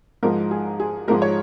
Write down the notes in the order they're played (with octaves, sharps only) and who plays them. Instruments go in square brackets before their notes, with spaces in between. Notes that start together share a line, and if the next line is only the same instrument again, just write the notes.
[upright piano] G#2 F3 G#3 A#4
G#4
G#4
G#2 F3 G#3 A#4
C#5